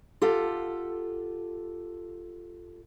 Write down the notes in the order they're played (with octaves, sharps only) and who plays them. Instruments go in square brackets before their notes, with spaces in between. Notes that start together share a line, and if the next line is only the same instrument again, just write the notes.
[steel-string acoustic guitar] F4 G4 A4 F#5